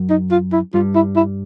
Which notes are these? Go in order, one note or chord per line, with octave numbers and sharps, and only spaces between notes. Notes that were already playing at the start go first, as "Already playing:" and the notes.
Already playing: F#2 F#3
D#4
F4
E4
G2 G3 F4
E4
E4